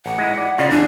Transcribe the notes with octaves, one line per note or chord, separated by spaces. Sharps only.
A1 F#5
G#3 D#4 E4
D5
C#3 D#4 F4 D5
E2 D4 G#4